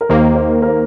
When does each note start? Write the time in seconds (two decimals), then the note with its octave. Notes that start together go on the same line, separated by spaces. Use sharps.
0.01 A#4
0.09 D#2 D#3 A#3 C5
0.35 C5
0.38 A#4
0.62 A#4
0.68 C5